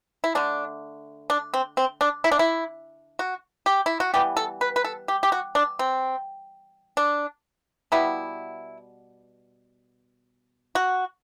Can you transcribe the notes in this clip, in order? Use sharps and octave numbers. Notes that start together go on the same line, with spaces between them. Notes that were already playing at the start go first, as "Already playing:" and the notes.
E4
D3 A3 D4
D4
C4
C4
D4
E4
D4
E4
F#4
G4
E4
F#4
E3 G3 B3 G4
A4
B4
B4
A4
G4
G4
F#4
D4
C4
D4
B2 G3 B3 E4
F#4